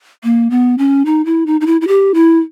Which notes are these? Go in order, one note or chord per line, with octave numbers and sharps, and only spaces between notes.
A#3
B3
C#4
D#4
E4
D#4
D#4
E4
E4
G4
E4